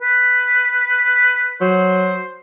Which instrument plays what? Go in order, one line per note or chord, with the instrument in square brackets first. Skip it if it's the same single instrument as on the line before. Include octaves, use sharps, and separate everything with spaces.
[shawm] B4
[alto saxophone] F#3 [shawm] C5